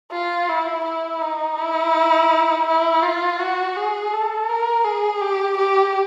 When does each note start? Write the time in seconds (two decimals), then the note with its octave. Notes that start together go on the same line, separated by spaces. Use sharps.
0.12 F4
0.49 E4
0.85 E4
1.22 D#4
1.57 E4
2.67 E4
3.03 F4
3.39 F#4
3.76 G#4
4.13 A4
4.49 A#4
4.84 G#4
5.21 G4
5.58 G4